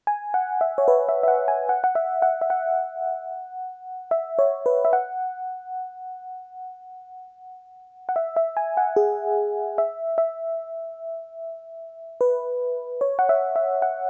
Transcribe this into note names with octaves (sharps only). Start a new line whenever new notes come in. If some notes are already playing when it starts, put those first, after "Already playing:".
G#5
F#5
E5
C#5
B4
E5
E5
F#5
G#5
F#5
F#5
E5
F#5
E5
F#5
E5
C#5
B4
E5
F#5
F#5
E5
E5
G#5
F#5
G#4
E5
E5
B4
C#5
F#5
E5
E5
F#5